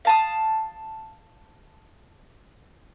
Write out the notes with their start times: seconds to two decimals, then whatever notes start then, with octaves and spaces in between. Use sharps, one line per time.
0.05 F5 A5 D#6